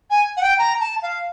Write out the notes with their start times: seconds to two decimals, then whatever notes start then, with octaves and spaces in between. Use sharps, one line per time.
0.10 G#5
0.36 F#5
0.42 G5
0.58 A#5
0.80 A5
1.02 F5